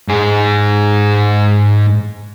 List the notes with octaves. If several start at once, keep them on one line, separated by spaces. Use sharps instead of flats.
G#2 G#4